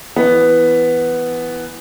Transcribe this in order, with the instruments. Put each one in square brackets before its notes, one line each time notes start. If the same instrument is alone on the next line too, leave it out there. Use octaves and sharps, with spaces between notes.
[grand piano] E3 B3